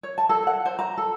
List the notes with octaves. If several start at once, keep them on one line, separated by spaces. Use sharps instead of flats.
C#5
A5
A4
F#5
C5
A#5
A4